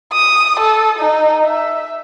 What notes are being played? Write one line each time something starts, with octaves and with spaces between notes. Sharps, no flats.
D#6
A4
D#4
E5